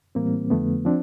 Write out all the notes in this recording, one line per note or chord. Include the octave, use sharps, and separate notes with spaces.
A2 E3 G3 A#3 C4
F2 D3 F3 A3 B3
F3 C4 D4